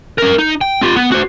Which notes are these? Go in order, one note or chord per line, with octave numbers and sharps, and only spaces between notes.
C#4 A#4
D#4
G5
F4 G4
B3
F#4 C5